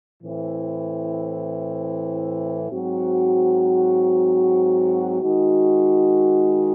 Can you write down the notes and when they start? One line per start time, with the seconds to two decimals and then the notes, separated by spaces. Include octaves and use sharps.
0.22 A2 E3 C4 E4
2.71 G#2 F#3 C4 F#4
5.20 D#3 G#3 D#4 F#4